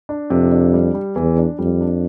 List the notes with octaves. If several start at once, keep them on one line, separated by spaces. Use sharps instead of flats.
D4
F2 C3
D4
G3
G3
E2 E3
D4
F2 G3
D4